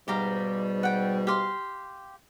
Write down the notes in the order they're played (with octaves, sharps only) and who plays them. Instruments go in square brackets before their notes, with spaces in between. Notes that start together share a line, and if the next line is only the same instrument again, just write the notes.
[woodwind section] G#2 B2 G3 [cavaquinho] G4 F5 A#5
[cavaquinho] F#5 G5
G4 F5 C6